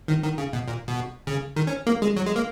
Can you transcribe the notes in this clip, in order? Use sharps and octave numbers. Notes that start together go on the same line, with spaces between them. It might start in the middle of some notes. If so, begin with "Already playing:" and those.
D#3
D#3
C#3
B2
A#2
B2
C#3
D#3
C#4
A#3
G#3
F#3
G#3
A#3